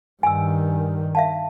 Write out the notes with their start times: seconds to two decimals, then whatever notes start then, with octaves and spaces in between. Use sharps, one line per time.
0.23 G2 D#3 G#5 E6
1.15 E5 F5 A5